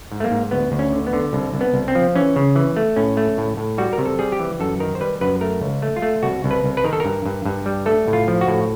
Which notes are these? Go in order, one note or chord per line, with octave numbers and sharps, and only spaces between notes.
G#2
A3
A#3
G#2
D2 B3
D2
C#4
D3
B3
D3
C2
C2
B3
C2
C4
F3
E3 C#4
C#3
E3
A3
A2 C#4
A3
A2
A2
G3 F#4
A#4
C3
A4
G3 G#4
G4
E3
F#2 A4
D#3 A#4
C5
G3 B4
F#2 B4
A3 A#4
C#2
A3
F4
A3
C2 F#4
C2
B4
C2
B4
D#3 A#4
A4
G2 A#4
G2
G2
G3
A3 A4
A2
F4
F3
F#4
A2